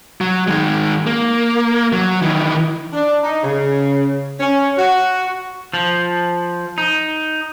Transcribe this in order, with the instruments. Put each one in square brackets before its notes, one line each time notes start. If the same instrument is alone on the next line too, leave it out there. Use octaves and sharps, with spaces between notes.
[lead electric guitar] F#3
D#3 G#3
A#3
F#3
D#3 E3
[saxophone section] D4
D#4
C#3
C#4
F#4
[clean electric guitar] F3
D#4